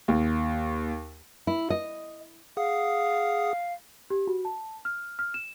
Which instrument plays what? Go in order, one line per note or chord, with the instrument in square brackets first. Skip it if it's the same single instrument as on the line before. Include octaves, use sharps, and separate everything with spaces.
[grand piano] D#2
[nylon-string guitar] E4
D#5
[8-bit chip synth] G#4 F#5 D#6 [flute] F5
[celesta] G4
F#4
A5
F6
F6
E7